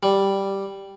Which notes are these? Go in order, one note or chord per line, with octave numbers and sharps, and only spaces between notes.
G3